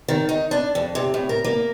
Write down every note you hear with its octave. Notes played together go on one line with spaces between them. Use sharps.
D#3
D#4
D4
F2
C3
A2
A#4
A#3